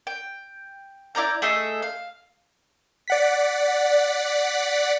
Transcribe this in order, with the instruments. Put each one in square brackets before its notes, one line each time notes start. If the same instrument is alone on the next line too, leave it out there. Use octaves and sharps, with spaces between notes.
[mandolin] G5
E4 D5 A#5 G6
A3 G#4 D#5 E5
F5
[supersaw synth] D5 F#5 B6